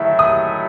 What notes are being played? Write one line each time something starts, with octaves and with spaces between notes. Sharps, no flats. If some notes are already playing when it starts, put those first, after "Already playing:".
Already playing: D#3 F#3 A3 E4 E5
D#6